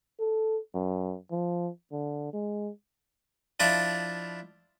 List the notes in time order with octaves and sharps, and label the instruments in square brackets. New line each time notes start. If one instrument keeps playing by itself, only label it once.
[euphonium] A4
F#2
F3
D3
G#3
[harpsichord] F3 D4 E4 D5 D#5